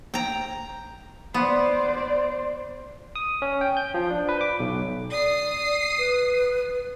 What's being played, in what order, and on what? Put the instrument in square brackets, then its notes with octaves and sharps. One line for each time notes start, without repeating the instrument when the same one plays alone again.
[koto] G5 A#5
[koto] B3 [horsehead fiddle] C5 D5
[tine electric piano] D#6
C#4
G5
G6
F3
D4
B4
D6
B1
[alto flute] D5 [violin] D#6 C7
[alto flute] B4